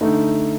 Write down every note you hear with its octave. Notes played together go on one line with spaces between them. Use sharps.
D3 A3 D#4